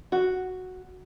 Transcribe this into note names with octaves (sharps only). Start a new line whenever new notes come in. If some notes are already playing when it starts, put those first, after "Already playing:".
F#4